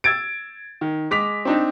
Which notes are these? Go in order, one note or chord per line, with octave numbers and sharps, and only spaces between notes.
E6 G#6 A6 D7
D#3
G#3 D6 B6 F7
C4 D4 D#4